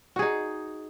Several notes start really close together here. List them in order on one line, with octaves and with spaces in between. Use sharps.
F#4 G#4 D#4